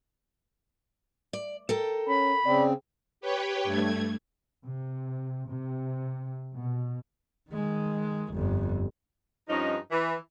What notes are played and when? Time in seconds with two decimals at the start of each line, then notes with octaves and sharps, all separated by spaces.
1.33 D5
1.69 A4 A#4 G5
2.08 C#4 B5
2.46 C#3 C4 D5
3.21 G4 B4 C#5 G5
3.64 G2 A3 G#6
4.65 C3
5.48 C3
6.55 B2
7.50 D#3 G#3
8.33 G1 F2
9.49 G2 F3 C#4 D#4
9.91 E3